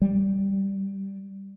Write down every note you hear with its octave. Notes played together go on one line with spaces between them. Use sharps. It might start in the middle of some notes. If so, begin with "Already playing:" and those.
G3